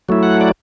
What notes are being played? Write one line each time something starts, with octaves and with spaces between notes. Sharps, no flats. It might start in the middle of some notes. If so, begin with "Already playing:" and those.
F#3 A3 E4
F#5
D5